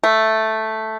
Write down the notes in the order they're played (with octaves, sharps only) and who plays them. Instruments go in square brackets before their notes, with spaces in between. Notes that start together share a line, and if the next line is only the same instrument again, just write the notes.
[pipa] A3